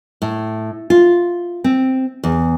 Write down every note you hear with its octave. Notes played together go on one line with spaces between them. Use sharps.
A2
F4
C4
E2